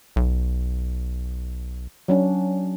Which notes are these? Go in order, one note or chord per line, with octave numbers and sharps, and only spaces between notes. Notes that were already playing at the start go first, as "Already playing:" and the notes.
B1
F#3 C#4 D4